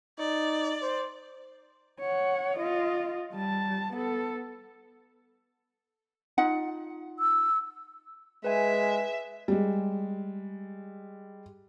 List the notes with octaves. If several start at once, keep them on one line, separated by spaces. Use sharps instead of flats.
D#4 D5
C5
C#5 F#5
F4 D#5
G3 A5
B3 A4
D#4 F4 F#5
E6
G#3 B4 E5 G#5
G3 G#3